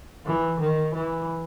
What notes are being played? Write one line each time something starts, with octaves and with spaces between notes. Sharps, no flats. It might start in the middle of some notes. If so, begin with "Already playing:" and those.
E3
D#3
E3